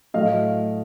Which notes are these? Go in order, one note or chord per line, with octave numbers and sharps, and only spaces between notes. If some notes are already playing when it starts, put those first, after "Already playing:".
A2 F#3 A3 D#5 F5